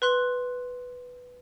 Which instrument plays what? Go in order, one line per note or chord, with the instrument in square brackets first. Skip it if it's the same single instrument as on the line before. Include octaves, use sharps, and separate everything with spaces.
[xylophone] B4 C6 F#6